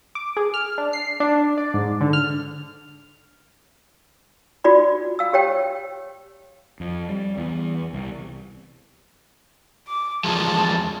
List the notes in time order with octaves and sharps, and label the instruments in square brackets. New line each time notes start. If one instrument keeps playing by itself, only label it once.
[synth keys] D6
G#4
F6
D4
C7
D4
D5
G#2
D3
F6
[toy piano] F4 F#4 D5 B5
F5 E6
G4 C#5 G5
[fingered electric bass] F2
G3
E2
C2
[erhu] D6
[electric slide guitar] E2 F3 G#3 [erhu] A5